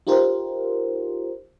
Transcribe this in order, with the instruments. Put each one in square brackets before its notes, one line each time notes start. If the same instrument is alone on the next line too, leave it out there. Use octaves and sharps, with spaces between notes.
[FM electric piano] D#4 F4 G4 A#4 C5